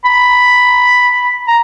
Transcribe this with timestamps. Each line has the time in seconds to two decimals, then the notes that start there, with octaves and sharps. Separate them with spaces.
0.05 B5
1.47 A#5